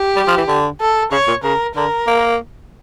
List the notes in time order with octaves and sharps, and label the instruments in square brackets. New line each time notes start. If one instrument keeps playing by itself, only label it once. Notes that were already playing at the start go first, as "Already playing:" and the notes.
Already playing: [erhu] G4
[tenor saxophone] G3
F3
E3
D3
[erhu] A4
[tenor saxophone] C#3 [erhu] C#5
[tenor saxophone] A#2
[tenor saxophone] C#3 [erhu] A#4
[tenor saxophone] D3 [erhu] A#4
[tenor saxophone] A#3